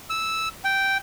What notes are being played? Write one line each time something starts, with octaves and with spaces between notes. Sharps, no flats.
E6
G5